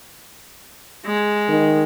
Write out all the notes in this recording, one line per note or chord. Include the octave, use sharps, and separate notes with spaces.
G#3
D#3